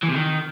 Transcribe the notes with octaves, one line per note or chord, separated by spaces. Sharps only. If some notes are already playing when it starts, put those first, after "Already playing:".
E3
C3
D#3